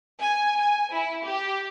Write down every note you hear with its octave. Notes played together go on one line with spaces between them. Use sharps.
G#5
G#5
E4
G4